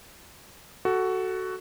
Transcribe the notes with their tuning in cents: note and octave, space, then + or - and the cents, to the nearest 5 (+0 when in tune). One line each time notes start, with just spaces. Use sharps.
F#4 +10 A4 +0